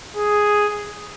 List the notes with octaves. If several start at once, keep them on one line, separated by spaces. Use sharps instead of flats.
G#4